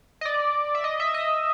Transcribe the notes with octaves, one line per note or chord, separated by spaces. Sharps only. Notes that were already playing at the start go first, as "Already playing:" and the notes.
D#5
D5
E5
D#5
E5
D#5